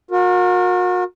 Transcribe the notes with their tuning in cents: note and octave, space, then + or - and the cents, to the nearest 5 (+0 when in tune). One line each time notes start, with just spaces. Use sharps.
F#4 -40 A#4 +0